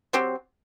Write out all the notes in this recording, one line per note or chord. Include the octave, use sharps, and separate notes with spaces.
F#3 C4 G4